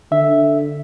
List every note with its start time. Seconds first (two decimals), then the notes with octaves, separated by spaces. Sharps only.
0.12 D3 E5